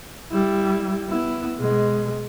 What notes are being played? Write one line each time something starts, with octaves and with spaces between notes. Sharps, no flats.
G3 E4
B3 E4
B2 G#3